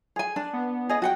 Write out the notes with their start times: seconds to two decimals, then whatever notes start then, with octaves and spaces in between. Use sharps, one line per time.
0.16 G#4 G#5
0.36 D4
0.53 B3
0.89 G#4 D#5
1.02 F#4 F#5 G5